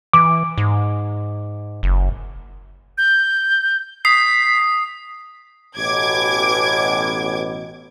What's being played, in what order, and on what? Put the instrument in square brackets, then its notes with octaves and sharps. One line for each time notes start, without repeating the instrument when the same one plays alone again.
[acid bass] E3 [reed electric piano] D6
[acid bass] G#2
F#1
[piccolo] G6
[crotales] D#6 C7 [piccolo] B6
[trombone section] A1 B2 [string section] D6 G#6